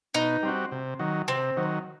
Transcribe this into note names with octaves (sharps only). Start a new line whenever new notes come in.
B2 D#4
G3 C4 F#4
C3
D#3 F#3
C3 C4
D#3 F#3